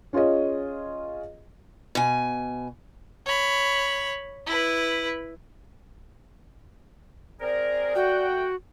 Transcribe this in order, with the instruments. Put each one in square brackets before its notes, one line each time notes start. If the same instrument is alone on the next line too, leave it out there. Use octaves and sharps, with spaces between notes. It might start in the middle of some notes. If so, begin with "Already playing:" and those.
[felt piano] C#4 F4 G#4 C#5 D#5
[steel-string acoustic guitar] B2 G#5
[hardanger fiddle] C#5 B5
E4 B4
[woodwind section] C4 G#4 A#4 [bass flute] D5
[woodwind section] A3 F#5 G5 [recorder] F#4